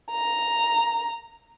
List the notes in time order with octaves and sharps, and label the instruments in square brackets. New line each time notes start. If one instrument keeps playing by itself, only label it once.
[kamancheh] A#5